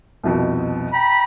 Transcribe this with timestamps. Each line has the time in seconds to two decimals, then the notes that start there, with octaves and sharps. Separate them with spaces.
0.24 C2 F2 B2
0.92 G5 A#5 B5